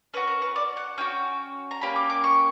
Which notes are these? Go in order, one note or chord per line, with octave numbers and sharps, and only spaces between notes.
C#4 F#4 B4
A#4
B4
D5
F#5
C#4 F#4 G5
A#5
A#3 C#4 G4 B5
D6
D6
C#6